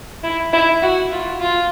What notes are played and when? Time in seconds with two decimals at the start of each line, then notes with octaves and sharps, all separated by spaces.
0.24 E4
0.53 E4
0.82 F#4
1.12 F4
1.41 F4